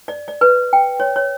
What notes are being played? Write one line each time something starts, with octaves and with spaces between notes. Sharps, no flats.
D5
D5
B4
G5
C#5
C#5